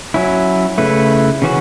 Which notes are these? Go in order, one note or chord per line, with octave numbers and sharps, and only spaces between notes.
F#3 C#4 E4
C#3 A3 E4 B4
C#3 E3 C#4 F#4